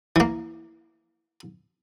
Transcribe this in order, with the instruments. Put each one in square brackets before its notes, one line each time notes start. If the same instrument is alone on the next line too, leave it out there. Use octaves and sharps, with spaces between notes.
[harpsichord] E3 A#3